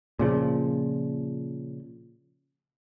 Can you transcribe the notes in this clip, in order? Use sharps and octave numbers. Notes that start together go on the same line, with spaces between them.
A#2 C#3 F3